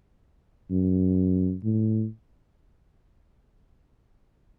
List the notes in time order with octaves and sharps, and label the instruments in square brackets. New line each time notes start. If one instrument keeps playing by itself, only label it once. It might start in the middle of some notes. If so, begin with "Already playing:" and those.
[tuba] F#2
A2